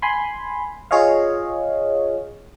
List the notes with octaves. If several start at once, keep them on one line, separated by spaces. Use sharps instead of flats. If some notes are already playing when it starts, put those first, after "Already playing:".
G#5 B5 C6
F4 G#4 C#5 D#5 F5